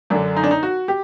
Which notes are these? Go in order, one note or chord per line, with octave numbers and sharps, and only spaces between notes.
F#2 D3 D4
D#4
D4
D#4
F#4
G4